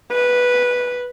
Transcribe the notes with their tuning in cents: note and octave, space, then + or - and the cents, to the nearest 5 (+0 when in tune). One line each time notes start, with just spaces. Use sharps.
B4 -5